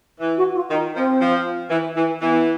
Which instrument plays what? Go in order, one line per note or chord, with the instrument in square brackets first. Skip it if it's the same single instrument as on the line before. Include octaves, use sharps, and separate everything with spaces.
[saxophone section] E3
[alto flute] F#4
F4
[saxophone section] D#3 [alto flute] D#4
[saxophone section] F3 [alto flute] C4
[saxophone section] F3
E3
E3
[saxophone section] E3 [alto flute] B3